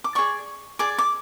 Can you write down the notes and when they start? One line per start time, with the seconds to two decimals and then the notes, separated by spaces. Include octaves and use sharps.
0.04 D6
0.15 G#4 D5 C#6
0.79 G#4 D5 D6
0.98 D6